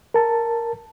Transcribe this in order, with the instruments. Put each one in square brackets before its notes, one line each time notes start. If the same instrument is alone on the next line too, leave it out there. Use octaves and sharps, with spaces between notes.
[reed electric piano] A#4 A5